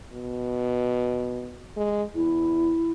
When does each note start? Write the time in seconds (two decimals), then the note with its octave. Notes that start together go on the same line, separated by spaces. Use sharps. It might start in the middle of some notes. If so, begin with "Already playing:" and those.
0.13 B2
1.77 G#3
2.15 E2 E4